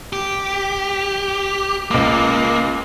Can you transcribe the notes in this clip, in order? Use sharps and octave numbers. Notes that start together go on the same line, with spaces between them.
G4
C#2 A#3 D6